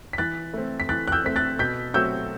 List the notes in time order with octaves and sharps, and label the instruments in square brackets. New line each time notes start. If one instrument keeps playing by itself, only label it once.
[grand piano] B6
[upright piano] E3 [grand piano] F#6 A6
[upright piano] A3 C4
[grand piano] B6
[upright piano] E3 [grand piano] F#6 A6
[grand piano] F#6
E6 G6
[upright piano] A3 C4 [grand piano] B6
[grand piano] F#6 A6
[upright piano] B2 [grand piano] G6 B6
[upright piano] F#3 A3 C4 F#4 [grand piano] E6 G6